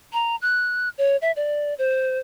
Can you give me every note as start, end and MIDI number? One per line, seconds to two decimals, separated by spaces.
0.13 0.36 82
0.42 0.89 90
0.98 1.17 73
1.22 1.32 76
1.36 1.74 74
1.79 2.19 72